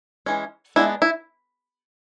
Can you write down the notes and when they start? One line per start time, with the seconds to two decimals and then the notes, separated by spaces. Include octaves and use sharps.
0.26 E3 G#3 C#4
0.76 G#3 B3 D4 E4
1.02 E4